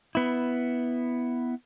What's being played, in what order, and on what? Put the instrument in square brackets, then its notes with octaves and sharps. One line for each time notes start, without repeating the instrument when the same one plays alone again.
[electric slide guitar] B3 E4